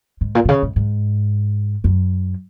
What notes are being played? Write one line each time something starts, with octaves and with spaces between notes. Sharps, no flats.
G#2
A#2
A#2
C#3
G#2
G#2
F#2